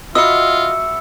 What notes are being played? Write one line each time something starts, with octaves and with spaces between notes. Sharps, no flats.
F4 F#4 D#5 E5 B5 E6 C#7